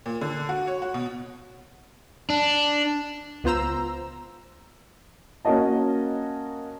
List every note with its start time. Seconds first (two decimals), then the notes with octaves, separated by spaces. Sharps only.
0.06 A#2
0.21 D3
0.49 F#4
0.67 C#5
0.82 F#4
0.94 B2
2.30 D4
3.44 C#2 B3 F4 C5 A#5 E6
5.45 A#3 C#4 F#4 A#4 D#5 A5